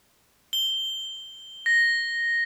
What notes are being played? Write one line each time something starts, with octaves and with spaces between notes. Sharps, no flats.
G7
A#6